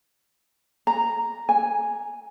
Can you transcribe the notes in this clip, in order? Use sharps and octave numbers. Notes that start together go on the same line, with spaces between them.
A#5
G#5